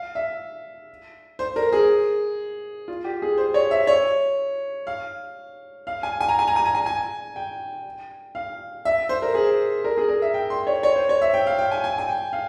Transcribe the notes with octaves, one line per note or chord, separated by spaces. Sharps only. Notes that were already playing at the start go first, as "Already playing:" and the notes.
Already playing: F5
E5
C5
A#4
G#4
F4
G4
G#4
C5
C#5
E5
C#5
F5
F5
G#5
G#5
A#5
G#5
A#5
G#5
A#5
G#5
G#5
G5
F5
E5
C5
A#4
G#4
A#4
G#4
A#4
E5
G5
C6
C#5
C#5
C5
C#5
E5
G5
F5
G5
G#5
G#5
G#5
G5
F5